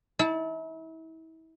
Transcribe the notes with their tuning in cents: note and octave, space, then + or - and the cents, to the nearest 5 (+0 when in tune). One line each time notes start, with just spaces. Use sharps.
E4 -35 A5 +0